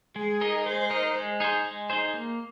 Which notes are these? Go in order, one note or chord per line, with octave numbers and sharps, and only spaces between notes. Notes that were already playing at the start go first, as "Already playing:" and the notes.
G#3 G#4
D#4 A#4 D#5
G#3 C5
D#4 A#4 D#5
G#3
D#4 G#4 C5
G#3
D#4 G#4 C5
A#3